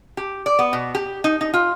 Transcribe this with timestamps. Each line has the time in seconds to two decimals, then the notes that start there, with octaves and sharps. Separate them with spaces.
0.17 G4
0.46 D5
0.59 B3
0.73 B2
0.95 G4
1.24 D#4
1.41 D#4
1.54 F4